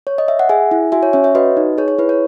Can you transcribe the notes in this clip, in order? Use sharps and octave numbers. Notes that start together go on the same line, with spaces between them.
C#5
D#5
E5
F#5
G#4 E5 G#5
E4
F#4 E5 G#5
C#5
C#4 C#5 E5
C#5 E5
F#4 B4 D#5
D#4
G#4 C#5
C#5
E4 B4
C#5